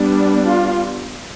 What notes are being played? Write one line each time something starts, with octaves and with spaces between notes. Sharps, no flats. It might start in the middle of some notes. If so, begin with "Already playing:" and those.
Already playing: G3 B3 D4
F4